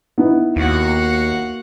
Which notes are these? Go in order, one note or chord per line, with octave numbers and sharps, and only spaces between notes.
B3 D#4 E4
D#2 A#3 F#4 F#5